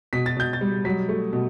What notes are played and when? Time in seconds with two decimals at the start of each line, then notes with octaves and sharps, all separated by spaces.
0.13 B2 B6
0.26 A6
0.37 B2 G6
0.53 A6
0.61 G3
0.85 F#3 B6
1.09 A3
1.33 B2